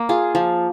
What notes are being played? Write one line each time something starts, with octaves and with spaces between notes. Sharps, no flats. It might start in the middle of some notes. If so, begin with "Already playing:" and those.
Already playing: A#3
F4 G#4
F3